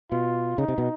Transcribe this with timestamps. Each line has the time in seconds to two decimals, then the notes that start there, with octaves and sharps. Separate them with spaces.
0.11 B2 F4
0.58 C#3 D#4
0.68 C3
0.78 B2